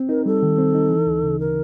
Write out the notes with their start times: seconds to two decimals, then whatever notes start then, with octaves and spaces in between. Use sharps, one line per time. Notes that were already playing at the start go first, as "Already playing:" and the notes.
Already playing: C4
0.09 D#4 A#4
0.26 G3 A4
0.42 D#3
0.58 C4
0.74 D#4
0.90 E3
1.07 D2
1.23 C#3
1.40 A#4